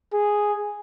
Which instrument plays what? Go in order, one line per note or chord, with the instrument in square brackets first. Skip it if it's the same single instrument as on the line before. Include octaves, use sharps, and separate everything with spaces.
[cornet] G#4